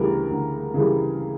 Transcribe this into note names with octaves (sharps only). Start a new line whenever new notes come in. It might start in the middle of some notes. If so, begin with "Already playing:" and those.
Already playing: D2 C#3 E3 G3 A#4
D2
C#3 E3 G3